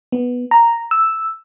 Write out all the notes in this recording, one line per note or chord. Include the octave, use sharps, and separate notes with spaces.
B3
A#5
E6